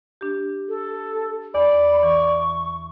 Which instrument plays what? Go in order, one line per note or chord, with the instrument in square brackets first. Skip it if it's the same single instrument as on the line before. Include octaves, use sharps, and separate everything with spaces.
[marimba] D4 G4
[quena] A4
[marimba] E2 [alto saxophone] D5 [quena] B5
[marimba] E3 [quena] C#6